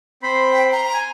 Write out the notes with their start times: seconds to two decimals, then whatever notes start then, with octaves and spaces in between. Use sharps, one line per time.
0.23 C4 C5 B5
0.52 G5
0.72 A#5 C6
0.94 G#5